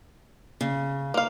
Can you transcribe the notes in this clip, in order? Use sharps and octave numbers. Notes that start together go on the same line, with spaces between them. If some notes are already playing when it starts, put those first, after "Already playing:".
C#3
A#3 F5